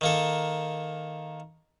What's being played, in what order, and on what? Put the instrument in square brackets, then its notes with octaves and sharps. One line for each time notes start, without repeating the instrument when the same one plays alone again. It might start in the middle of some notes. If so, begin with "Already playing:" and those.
[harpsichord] D#3 A#3 A4